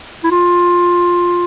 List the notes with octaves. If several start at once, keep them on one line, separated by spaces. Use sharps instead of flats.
E4
F4